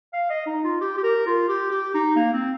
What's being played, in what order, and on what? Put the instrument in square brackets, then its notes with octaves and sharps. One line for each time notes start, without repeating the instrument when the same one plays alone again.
[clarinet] F5
D#5
D#4
F4
G4
G4
A#4
F4
G4
G4
D#4
A#3
C4